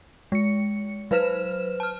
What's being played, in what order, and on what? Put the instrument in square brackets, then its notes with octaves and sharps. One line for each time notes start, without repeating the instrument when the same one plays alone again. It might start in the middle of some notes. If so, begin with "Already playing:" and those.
[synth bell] G#3 C#7
F#3 B4 C5 F6 E7
A5 F6